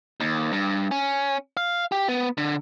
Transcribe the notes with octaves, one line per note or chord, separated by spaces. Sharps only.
D#2
G2
C#4
F5
G4
B3
D3